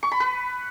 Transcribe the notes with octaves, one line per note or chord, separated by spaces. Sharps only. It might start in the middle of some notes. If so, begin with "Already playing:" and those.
C#6
B5
B4